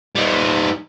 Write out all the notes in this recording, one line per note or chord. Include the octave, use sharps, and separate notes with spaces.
G3 D#4